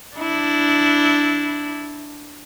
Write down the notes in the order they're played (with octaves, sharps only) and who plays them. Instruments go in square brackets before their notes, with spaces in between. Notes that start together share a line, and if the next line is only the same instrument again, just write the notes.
[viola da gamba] D4 E4